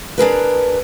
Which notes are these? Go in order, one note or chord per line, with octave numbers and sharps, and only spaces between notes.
D4 G#4 A#4 B4